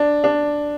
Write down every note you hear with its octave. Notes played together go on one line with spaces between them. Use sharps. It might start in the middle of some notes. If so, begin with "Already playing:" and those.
Already playing: D4
D4